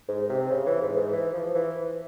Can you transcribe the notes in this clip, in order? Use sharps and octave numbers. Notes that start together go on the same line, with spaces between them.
G#2
C3
C#3
E3
G#2
G#2
E3
F3
E3